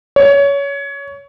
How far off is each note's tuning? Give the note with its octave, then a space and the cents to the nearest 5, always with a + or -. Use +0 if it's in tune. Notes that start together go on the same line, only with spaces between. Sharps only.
C#5 +20